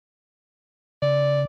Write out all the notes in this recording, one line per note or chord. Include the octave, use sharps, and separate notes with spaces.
C#3 D5